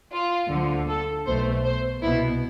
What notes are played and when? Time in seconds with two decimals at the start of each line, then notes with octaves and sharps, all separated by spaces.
0.12 F4
0.50 D2 D3 F3
0.87 A4
1.26 B1 B2 A3 C5
1.64 C5
2.02 C2 B2 B3 E4